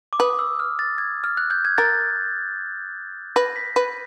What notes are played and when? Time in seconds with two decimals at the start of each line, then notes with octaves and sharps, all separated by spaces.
0.13 D6
0.19 B4 D#6
0.39 E6
0.59 F6
0.79 A6
0.98 G#6
1.24 F6
1.37 F#6
1.50 G6
1.65 G#6
1.78 A#4 A6
3.36 B4 A#6
3.56 B6
3.76 B4